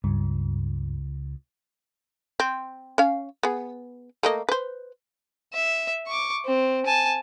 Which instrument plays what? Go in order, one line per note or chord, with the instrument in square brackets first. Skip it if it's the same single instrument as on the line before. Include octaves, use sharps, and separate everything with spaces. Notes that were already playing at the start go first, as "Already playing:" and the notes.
[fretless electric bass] C#2 [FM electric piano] G2
[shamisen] C4
C#4 F5
B3 G#4
A3 A#3 D#5
B4 C5
[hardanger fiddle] E5
C#6 D6
C4
G#5 A5